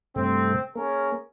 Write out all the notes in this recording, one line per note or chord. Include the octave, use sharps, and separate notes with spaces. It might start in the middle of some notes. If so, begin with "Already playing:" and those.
G2 C3 A3 C4
A#3 C#4 G#4 A#4